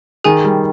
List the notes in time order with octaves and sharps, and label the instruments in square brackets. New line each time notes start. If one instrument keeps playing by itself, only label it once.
[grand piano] D#3 [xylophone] G#4 G#5
[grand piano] G3